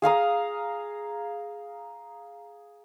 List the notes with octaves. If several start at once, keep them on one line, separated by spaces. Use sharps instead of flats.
G#4 F5 A#5 D#6